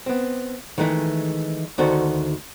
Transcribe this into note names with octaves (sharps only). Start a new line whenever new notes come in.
B3 C4
D#3 E3 G#3 A3
D2 D#3 F#4 A4 C5